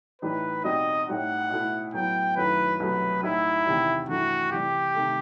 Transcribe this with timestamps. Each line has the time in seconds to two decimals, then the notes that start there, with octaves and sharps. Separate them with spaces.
0.22 A2 E3 G3 D#4 B4
0.64 B2 G3 C4 D#4 D#5
1.08 A2 G3 D#4 F#5
1.50 B2 A3 E4
1.93 A2 F#3 B3 E4 G5
2.36 F#2 D#3 F#3 A3 E4 B4
2.80 C2 B2 F#3 A3 B4
3.23 A2 G3 D#4 E4
3.66 E2 C3 D#3 G3
4.09 G2 E3 A3 E4 F#4
4.51 C3 E3 G3 G4
4.95 C3 D#3 A3